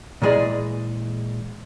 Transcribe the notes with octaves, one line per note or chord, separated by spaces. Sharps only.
A#2 E3 G#3 G#4 D5 D#5